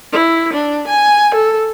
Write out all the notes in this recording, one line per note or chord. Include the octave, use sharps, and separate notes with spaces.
E4
D4
G#5
A4